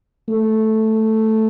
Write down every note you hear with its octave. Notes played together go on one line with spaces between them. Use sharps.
A3